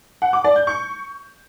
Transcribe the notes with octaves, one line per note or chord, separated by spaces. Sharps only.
F#5
D6
D5
G6
C#6